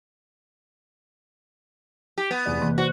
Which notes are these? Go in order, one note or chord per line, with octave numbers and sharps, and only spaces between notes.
G4
B3
F1 E2 D5
C3 E3 A#3
F#4 C5 D5